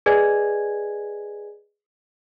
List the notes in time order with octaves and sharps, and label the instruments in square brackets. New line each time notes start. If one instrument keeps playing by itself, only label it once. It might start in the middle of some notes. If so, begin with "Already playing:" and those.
[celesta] G#4 B4 D5 D#5 G#5 G#6